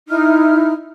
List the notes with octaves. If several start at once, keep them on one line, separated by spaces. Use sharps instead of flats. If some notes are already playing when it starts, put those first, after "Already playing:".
D#4 E4 F6